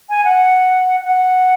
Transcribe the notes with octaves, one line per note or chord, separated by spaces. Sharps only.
G#5
F#5
F#5